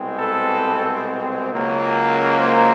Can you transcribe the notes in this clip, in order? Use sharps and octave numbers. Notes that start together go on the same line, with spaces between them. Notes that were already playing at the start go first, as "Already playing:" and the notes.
Already playing: C2 B2 G#3 C4
A4 B4
C#2 C#3 F#3 A#3
A#4 C5